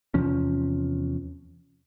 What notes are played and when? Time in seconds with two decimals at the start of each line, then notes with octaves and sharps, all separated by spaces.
0.14 E2 C3 F3 C#4